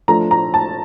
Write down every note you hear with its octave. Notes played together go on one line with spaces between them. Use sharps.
F3 A3 D4 A#5
A#5
A5